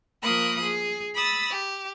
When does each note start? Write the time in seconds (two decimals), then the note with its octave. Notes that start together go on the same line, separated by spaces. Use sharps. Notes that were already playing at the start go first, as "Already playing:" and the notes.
0.22 F3 A#3 A#4 B5 D#6 F#6
0.62 G#4
1.16 B5 D#6 E6 A6
1.50 G4